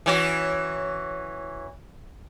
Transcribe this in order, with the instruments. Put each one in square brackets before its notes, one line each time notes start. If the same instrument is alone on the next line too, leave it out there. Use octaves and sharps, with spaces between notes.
[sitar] E3 C#4 F#4